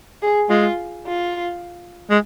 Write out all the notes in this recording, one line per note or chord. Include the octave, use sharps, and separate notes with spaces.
G#4
G#3 F4
F4
G#3